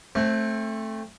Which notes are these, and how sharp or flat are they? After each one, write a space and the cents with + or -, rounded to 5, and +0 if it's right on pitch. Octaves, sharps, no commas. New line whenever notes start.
A3 +0 C4 +25